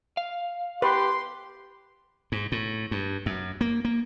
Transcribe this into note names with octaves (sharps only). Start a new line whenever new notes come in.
F5
G4 B4 C6
G#2
A2
G2
F#2
A#3
A#3